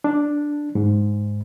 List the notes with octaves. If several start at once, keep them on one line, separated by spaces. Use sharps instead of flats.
D4
G#2